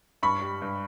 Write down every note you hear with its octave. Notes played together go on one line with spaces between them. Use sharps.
G2 B5 C#6
G3
G2